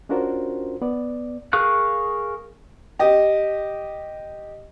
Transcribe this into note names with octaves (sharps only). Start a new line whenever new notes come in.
C#4 D4 F4 F#4 A#4 C5
B3 D5
G#4 A#4 F5 C#6 F#6
G4 D#5